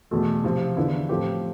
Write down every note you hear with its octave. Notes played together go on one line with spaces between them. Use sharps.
E2 B2 A3
C3 F3 C4 F4
E2 D3 F3 B3 E4
A2 F3 A3 C4 G4